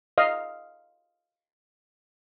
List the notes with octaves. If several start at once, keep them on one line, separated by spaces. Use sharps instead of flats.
D#5 F5